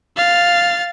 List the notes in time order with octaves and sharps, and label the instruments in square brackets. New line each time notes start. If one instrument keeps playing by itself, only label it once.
[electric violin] F5 A6